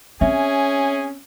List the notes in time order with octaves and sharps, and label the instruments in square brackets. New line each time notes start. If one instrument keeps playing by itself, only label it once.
[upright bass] C4 [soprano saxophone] C#4 [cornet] G#4 [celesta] E5